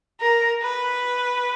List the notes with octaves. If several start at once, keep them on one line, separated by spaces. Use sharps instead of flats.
A#4
B4